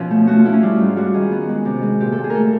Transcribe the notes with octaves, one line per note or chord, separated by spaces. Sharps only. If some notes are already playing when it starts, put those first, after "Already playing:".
Already playing: B2 F3 C#4
A3
A3 F#4
F4
A3 E4
C#4
G3 F4
G#2
G3 F#4
D#3 G#4
B3
G#3
C3
G#3
A#2 G4
A4
A#2
G#4
A3 A4 A#4